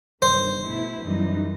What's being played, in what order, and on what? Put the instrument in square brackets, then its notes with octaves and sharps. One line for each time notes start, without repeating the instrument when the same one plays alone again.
[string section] G1 G2 D#3 [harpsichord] C5
[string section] B2 A3 E4
F#2 E3 G3 D#4